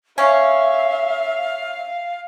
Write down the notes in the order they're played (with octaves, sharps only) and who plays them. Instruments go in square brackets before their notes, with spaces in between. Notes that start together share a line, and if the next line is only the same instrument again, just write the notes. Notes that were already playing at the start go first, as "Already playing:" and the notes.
[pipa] C#4 [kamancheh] E5 [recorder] F5